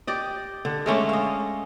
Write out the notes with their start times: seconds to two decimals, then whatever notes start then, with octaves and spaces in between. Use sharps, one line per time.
0.07 G4 D5 D#5
0.65 D3
0.86 G#3 A3 C#4 D4
1.09 D#5 F5